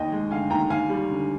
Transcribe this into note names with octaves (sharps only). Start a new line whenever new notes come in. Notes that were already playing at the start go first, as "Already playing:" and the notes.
Already playing: D#2 D#5 G5
G#3
D3 F5 G#5
D#2 G5 A#5
D#2 F5 G#5
G3
D3